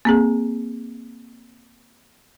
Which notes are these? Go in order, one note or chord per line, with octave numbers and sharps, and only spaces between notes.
A#3 C4 G#4